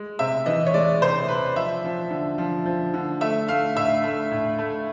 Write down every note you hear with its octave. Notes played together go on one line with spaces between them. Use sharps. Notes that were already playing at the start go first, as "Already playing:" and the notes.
Already playing: G#3
C3 E5
E3 D#5
C#5
G#3 D5
C3 C5
C3 B4
F3 E5
F3
D3
F3
F3
D3
A3 E5
A3 F5
A2 E5
A3
A2
A3